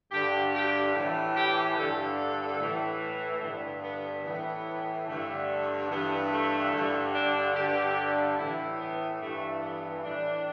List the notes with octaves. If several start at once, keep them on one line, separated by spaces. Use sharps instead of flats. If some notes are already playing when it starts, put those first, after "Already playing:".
G2 D3 G4
G4
A2 E3
G4
G2 D3 A4
A2 E3
G2 D3 B3
B3
A2 E3 B3
G2 D3 A3
G2 E3 B3
A3
G2 D3
D4
G2 D3 G4
A2 E3 E4
B3
G2 E3 A3
B3
A2 E3 D4